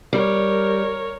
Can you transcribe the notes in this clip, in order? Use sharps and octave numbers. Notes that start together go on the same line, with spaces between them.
G3 A#4 C#5